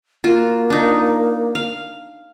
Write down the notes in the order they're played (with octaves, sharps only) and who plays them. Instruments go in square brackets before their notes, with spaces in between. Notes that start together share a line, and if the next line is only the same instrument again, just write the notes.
[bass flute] A#3 [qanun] F4 F#4
[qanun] D4 D#4
F5